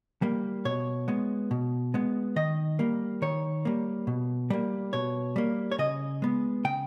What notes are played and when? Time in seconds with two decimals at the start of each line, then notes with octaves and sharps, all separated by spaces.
0.22 G3 A#3
0.65 B2 C#5
1.08 G#3 B3
1.51 B2
1.94 G#3 B3
2.36 D#3 D#5
2.79 G3 A#3
3.22 D#3 C#5
3.65 G3 A#3
4.07 B2
4.50 G3 A#3
4.93 B2 C#5
5.36 G3 A#3
5.72 C#5
5.78 C#3 D#5
6.22 G#3 B3
6.64 C#3 G5